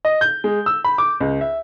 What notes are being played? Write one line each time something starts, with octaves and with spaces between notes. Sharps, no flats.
D#5
G6
G#3
E6
B5
D6
C#2
E5